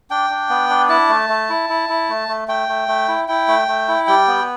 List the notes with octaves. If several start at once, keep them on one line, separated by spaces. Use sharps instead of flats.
D4 G5
D4
B3
D4
E4 A5
A3
A3
E4
E4
E4
A3
A3
A3 G5
A3
A3
E4
E4 G5
A3
A3
E4
G3 G5
B3